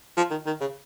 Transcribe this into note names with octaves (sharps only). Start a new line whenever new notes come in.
F3
D#3
D#3
C#3